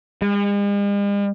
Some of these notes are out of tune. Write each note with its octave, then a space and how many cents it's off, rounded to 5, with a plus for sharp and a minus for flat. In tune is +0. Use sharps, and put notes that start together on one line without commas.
G#3 -45